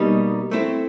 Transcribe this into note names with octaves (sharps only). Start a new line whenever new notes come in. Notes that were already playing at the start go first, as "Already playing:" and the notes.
Already playing: B2 G3 A#3 D#4
A3 C4 E4